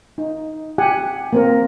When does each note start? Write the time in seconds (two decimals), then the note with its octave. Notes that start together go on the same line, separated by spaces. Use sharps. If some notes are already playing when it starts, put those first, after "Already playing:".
0.18 D#4
0.78 G4 F#5 G#5
1.33 A#3 C4 A#4